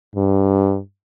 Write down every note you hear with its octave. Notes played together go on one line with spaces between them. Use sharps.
G2